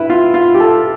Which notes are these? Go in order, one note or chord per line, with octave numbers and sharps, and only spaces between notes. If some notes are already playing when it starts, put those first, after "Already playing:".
Already playing: G2 E4 B4
F4
F4
G4
A4